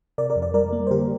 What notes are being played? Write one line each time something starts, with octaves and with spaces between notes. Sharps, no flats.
C3 A#4 D5
A#4 D5
F2
A#4 D5
G3 A#4 D5
A#3
C5
D3 G4 A#4